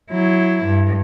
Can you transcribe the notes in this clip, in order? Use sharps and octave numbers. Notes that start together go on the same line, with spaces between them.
F#3 E4
G2